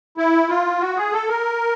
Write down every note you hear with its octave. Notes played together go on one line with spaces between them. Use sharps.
E4
F4
F#4
G#4
A4
A#4